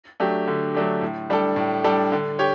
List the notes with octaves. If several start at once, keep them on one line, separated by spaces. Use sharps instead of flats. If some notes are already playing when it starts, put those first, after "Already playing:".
F#3 A3 D4 G4
D3
F#3 A3 D4 G4
A2
G3 D4 A4
A2
G3 D4 A4
D3
G4 C#5